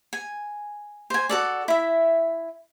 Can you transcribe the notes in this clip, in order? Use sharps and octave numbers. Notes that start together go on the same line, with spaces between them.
G#5
C5 G#5
F#4 A4 D5
E4 E5